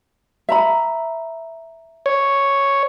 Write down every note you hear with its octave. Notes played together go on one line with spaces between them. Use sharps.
E5 A#5 B5
C#5